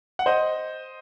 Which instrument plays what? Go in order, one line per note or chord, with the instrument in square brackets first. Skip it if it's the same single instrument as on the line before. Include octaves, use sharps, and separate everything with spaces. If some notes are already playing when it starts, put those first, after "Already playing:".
[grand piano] F#5
C5 D#5